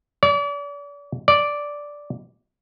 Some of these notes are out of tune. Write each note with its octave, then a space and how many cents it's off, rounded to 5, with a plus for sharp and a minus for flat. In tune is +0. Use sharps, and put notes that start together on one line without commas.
D5 -40
D5 -5